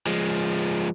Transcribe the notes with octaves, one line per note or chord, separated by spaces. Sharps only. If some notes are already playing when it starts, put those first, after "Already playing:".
F3 G#3